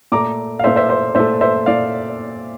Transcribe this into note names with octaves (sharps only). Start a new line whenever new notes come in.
A#2 A3 A#5 D6
F5
A#2 A3 C5 E5
C5 E5
C5 E5
A#2 A3 C5 E5
C5 E5
A#2 A3 D5 F5